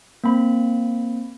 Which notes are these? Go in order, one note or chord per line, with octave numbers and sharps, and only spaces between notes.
A#3 C4 B5